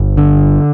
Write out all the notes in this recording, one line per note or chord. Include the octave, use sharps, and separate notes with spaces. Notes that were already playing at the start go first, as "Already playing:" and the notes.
Already playing: G1
D3